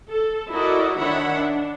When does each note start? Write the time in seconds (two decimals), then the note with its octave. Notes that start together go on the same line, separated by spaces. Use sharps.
0.11 A4
0.51 E4 F#4 A4 A#4 D5 D#5
0.99 D#3 D4 C#5 E5 F#5 B5
1.33 D4